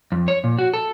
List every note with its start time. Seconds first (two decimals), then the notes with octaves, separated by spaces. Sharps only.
0.12 F2
0.28 C#5
0.44 A#2
0.59 F#4
0.74 A4